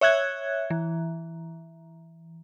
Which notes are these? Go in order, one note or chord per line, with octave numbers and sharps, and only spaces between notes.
C#5 E5 F#6 G#6
E3